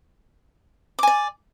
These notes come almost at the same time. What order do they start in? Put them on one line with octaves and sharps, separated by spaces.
D6 G#5 D5